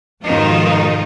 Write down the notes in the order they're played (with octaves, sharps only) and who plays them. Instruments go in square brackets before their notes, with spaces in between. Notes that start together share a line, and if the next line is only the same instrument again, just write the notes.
[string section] F2 G#2 B2 D#3 D#4 F4